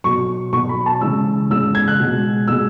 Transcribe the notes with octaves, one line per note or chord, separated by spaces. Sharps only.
B2 F#3 C#6
B2 F#3 C#6
B5
A5
C#3 E3 G#3 E6
C#3 E3 G#3 E6
G#6
F#6
B2 G#3
B2 G#3 E6